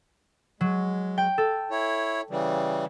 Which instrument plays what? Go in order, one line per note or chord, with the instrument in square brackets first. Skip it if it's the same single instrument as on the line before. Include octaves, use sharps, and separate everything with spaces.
[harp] F#3 [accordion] G#3
[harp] G5
A4
[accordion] E4 C#5
C#3 E3 G3